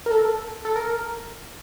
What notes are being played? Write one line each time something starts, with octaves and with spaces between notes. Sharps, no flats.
A#4
A4
A4
A#4